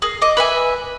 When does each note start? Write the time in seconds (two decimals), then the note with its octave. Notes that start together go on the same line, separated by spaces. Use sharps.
0.02 G#4 A#4
0.22 D#5 D6
0.37 B4 E5 G#5